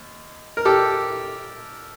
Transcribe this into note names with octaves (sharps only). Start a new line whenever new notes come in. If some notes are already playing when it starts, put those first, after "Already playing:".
Already playing: D#2
A#4
G4 A4